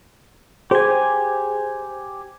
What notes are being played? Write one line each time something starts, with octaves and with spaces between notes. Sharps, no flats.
G4 G#4 C5 G#5